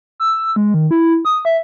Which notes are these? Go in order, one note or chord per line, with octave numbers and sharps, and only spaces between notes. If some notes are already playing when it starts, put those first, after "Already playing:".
E6
G#3
D#3
E4
D#6
E5